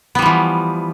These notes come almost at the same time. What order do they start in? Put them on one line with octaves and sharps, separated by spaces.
B3 G3 F3 E3